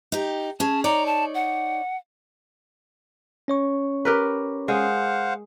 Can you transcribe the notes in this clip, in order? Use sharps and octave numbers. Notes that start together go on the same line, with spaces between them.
D#4 G4
C#4 G#4 A5
D#4 C#5 D5 A#5
A5
F#5
C#4 C#5 C#6
G4 A#4 B4
G#3 C5 F5 F#5